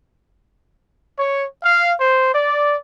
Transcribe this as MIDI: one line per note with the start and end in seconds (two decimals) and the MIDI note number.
1.17 1.44 73
1.62 1.92 77
2.00 2.31 72
2.34 2.76 74